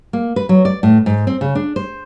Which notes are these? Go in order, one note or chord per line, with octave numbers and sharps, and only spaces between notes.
A#3
B4
F#3
D5
A2
G#2
C4
C#3
D4
C5